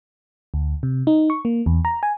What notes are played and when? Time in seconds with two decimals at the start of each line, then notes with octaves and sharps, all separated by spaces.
0.54 D2
0.83 C3
1.07 D#4
1.30 C#6
1.45 A#3
1.66 E2
1.85 A#5
2.03 G#5